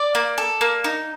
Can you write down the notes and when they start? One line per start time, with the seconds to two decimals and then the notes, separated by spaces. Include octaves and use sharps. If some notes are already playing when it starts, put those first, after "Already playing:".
Already playing: D5 D6
0.15 A#3
0.38 A4
0.61 A#3
0.84 D#4